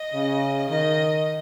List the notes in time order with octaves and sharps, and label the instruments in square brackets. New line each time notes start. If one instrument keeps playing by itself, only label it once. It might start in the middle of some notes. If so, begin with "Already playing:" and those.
Already playing: [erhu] D#5
[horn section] C#3
[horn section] D#3 [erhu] D#5